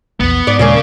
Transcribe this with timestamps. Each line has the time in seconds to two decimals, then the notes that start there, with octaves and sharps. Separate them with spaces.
0.20 A#1 E2 B3
0.47 G#2 D5
0.59 D#2 A#2 C#3 G#3 A#3 C#4 D4